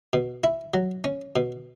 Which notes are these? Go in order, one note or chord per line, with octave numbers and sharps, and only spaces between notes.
B2
E4
F#3
C#4
B2